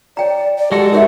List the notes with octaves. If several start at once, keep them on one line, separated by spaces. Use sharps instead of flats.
C#5 D5 G5 A#5
D5
G#3 F#4 G4 A4
D#4 A#4 C#5 E5